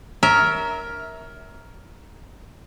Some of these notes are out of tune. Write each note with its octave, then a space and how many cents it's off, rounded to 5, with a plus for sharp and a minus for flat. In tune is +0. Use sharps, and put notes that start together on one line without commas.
A#4 +5 C#5 +25 E5 -20